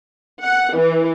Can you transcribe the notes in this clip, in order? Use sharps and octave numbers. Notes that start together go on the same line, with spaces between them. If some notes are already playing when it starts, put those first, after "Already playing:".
F#5
E3